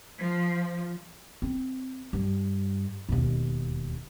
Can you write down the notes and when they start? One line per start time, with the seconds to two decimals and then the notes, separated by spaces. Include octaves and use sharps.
0.21 F3
1.42 C4
2.13 G2
3.09 E1 D#2